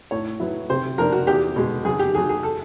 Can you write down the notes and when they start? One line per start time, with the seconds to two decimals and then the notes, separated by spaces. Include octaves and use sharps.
0.11 A2 C#5
0.40 F#3 B3 E4
0.70 C3 C5
0.98 F3 A#3 D4 A#4
1.12 F#4
1.27 E2 G4
1.56 B2 G#3
1.85 F#2 G#4
1.99 G4
2.14 D#3 F#3 G#4
2.29 G#4
2.43 A4